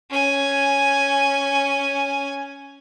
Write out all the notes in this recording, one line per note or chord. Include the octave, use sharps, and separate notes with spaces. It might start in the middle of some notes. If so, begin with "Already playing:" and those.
C#4 G#5